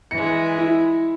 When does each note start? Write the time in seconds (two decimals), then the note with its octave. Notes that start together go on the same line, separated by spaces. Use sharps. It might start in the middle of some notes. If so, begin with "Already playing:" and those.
0.11 E3 G#3 C#7
0.58 E4